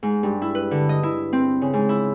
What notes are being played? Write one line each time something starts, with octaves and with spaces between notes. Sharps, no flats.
G#2
G2
E4
B4
D3
D#5
E4
C4
C#3
G#2
E4